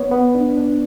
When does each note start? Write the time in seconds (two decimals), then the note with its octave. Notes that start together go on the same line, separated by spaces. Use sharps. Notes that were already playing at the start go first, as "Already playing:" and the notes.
Already playing: B3 C#5
0.12 B3
0.35 D4
0.57 D4